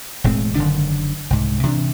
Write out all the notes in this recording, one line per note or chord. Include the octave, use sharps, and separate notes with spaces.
E1 A2 G#3 C4
F#1 D3 D#3 D4
C2 G#2
C3 E3 C#4 D4